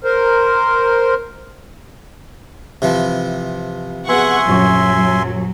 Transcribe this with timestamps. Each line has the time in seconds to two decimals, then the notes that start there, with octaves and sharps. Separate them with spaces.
0.04 A#4 C5
2.82 C3 E3 F3
4.09 B3 G#4 E5 F#5 G#5 C6 C#6
4.47 D#1 F#2 F#3 C#6